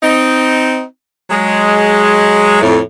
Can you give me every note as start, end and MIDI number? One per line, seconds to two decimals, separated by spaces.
0.02 0.83 60
0.02 0.83 63
1.30 2.60 54
1.30 2.60 56
2.62 2.79 41
2.62 2.79 45